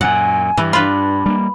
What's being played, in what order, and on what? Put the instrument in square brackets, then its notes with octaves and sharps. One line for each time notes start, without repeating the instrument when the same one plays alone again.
[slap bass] F#2 A#2 [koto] F#5 [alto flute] G#5
[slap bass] G2 [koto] E3
[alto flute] D4 [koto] F4 B4 [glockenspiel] B5
[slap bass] G3 A#3